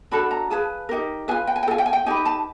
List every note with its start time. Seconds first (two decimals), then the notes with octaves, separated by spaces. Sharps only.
0.11 D4 F#4 A4 B5
0.31 A#5
0.50 F4 G#4 B4 A5
0.89 D#4 G4 A#4
1.28 F4 G#4 B4 G#5
1.47 G5
1.56 G#5
1.63 G5
1.68 A4
1.71 F4 G#5
1.78 G5
1.86 G#5
1.93 G5
2.06 D#4 G4 B4 G#5
2.25 A5